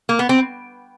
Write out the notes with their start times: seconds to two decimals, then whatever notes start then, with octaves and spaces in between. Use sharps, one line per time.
0.09 A#3
0.19 B3
0.29 C4